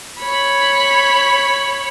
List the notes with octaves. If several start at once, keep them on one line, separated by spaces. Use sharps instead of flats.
C#5 B5